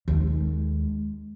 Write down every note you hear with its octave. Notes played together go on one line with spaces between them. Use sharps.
D#2 G#3